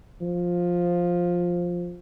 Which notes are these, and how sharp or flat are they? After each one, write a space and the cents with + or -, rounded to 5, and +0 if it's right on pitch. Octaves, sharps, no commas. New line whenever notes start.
F3 +10